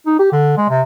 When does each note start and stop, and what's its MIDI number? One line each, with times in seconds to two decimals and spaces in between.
0.06 0.16 63
0.19 0.30 67
0.32 0.57 50
0.57 0.68 56
0.69 0.82 48